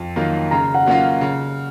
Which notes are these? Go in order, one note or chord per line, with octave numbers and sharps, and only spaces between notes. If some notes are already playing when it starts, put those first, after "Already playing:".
Already playing: F2
D#3 F#3 A#3 F4
C#3 A#5
F#5
F#3 A#3 C#4 F4
C#3